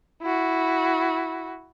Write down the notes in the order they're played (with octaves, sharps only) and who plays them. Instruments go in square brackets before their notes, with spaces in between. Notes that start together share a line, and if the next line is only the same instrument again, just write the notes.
[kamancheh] E4 F#4